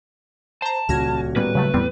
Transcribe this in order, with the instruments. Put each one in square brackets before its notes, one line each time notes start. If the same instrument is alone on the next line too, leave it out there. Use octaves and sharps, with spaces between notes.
[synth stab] C5 A#5 [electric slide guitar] A5
[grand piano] D#1 F#4 [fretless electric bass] C#2 [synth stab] F6 G#6 A#6
[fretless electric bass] A2 G3 [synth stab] A#3 B3 C#4 [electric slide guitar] B4
[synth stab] C#3 F#3 A3
[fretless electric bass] E2 A2 [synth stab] G3 B3 C4